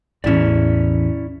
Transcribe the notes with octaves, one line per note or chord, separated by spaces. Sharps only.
A1 E2 C#4 E4 D5